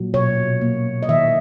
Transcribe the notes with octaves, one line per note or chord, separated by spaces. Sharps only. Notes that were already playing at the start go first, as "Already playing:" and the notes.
Already playing: A#2 F#3
B2 C#5
A#3
D#5
D#3 E5